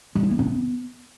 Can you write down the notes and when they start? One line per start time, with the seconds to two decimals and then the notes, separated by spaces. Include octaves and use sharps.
0.15 G3
0.23 E4
0.31 A#3
0.39 C4
0.47 B3